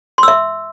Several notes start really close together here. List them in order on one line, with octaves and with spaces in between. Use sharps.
C6 E6 E5